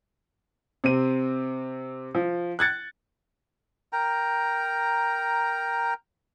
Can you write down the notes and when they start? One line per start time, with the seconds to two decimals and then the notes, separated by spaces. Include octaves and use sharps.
0.84 C3 C4 D#7
2.15 F3
2.59 F#6 G#6 A6 C#7
3.93 A#4 G5 A#5